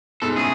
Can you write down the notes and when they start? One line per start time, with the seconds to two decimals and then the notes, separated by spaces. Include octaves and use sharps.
0.22 G#2 B2 A4
0.36 A2 C#3 G#4